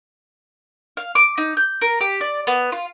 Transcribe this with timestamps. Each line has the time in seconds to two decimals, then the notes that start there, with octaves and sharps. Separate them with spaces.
0.97 F5
1.15 D6
1.38 D#4
1.57 G6
1.81 A#4
2.01 G4
2.21 D5
2.47 B3
2.72 F4